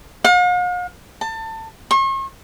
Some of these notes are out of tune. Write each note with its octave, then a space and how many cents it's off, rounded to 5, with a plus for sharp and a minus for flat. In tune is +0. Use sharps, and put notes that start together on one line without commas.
F5 +45
A5 +25
C#6 -45